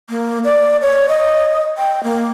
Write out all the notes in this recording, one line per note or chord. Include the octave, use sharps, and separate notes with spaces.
A#3
D5
C#5
D#5
G5
A#3